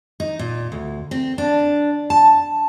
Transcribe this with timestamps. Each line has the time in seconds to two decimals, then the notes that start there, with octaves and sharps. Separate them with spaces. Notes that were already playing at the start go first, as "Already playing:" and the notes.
0.20 D#4
0.39 A#2
0.72 D2
1.11 C4
1.38 D4
2.10 A5